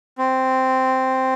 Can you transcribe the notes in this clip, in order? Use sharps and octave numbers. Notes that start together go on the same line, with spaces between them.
C4